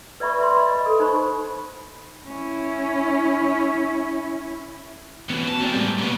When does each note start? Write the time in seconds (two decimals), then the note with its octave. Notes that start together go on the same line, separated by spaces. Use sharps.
0.20 B4 D5 E5 B5 C#6
0.38 B4 E5 C6
0.56 D#5 B5
0.70 D#5
0.86 A4
0.99 D#4 C5 B5 C#6
2.27 C#4 E4
5.30 E3 B3 C#4 F#4
5.49 A5
5.61 G#3 A#3 C4 C5 D5
5.73 A2 G3 G4
5.99 B1 C#3 A#3 B3